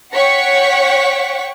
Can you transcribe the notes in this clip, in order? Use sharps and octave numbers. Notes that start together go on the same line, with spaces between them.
C#5 F#5 G5 C#6 B6